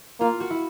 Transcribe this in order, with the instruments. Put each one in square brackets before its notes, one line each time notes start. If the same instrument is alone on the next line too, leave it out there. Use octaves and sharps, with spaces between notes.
[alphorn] A#3 [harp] F4
[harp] F#4
E4